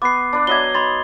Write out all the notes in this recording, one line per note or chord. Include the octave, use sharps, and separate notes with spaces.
B3 B4 D6 C7
D4 B4
F#3 D#5 E5 G#6 G7
D#4 B5 C6 A6